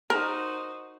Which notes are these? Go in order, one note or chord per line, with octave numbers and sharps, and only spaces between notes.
D#4 F#4 A#4 C5